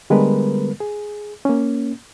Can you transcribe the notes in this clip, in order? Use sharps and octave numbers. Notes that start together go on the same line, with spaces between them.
D3 G3 G#3 B3 A#4 B4
G#4
A#3 C#4